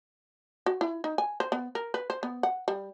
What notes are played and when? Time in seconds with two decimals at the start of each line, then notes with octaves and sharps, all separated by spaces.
0.66 F#4
0.81 E4
1.04 D#4
1.18 G#5
1.40 C5
1.52 B3
1.75 A#4
1.94 B4
2.10 C5
2.23 B3
2.43 F#5
2.68 G3